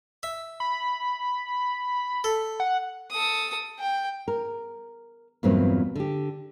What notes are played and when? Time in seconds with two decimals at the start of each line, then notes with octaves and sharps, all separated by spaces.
0.23 E5
0.60 B5
2.24 A4
2.60 F#5
3.11 A4 D#6
3.79 G5
4.28 A#4
5.43 E2 G2 A#2 F#3 A#3 C4
5.95 D3 G4